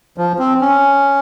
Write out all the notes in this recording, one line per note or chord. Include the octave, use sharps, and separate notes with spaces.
F3
C4
C#4